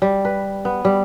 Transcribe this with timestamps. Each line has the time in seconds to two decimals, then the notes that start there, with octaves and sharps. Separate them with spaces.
0.02 G3
0.25 B4
0.65 B3
0.85 G3